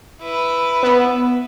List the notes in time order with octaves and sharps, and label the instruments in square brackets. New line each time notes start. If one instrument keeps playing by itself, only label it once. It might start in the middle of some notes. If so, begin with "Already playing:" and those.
[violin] E4 B4
[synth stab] B3